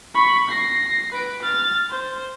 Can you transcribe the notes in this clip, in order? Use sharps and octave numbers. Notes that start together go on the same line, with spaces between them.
B5 C#6
A#6 C7
B4 D7
F6 A6
C5